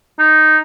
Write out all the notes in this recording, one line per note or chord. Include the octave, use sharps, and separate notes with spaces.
D#4